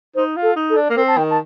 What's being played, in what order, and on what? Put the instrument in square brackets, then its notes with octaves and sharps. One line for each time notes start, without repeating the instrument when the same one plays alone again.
[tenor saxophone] D#4 [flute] C5
[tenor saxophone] F4
[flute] A4
[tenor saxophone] D#4
[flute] A4
[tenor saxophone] D4
A#3
[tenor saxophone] C4 [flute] A#4
[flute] A5
[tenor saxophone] D#3 [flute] G5
[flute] A5